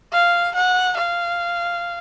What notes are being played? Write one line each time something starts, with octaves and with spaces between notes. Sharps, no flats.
F5
F#5
F5